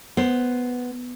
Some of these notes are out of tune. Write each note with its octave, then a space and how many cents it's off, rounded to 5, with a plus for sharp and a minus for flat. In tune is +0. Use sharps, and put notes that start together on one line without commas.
B3 +0 C5 +0